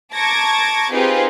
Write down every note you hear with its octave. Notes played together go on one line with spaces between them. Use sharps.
A5 A#5 C#6 D6 G#6 A#6
C4 D#4 F4 G4 G#4 B4